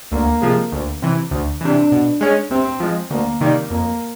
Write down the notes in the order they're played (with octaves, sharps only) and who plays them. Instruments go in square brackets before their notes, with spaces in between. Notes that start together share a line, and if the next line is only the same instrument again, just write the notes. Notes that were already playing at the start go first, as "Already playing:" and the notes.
[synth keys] D2 [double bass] A#3
[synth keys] C3 F3 G#3
D2
C3 E3
D2
[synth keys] C3 E3 [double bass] D4
[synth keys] B2
G#3 C#4
[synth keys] C3 [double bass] C4
[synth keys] F3 G#3
[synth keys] D2 [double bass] A#3
[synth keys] C3 D#3 G3 A#3
[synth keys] F2 [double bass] A#3